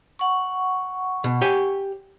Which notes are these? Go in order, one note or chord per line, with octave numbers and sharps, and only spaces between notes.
F#5 C#6
B2
G4 C#5 G#5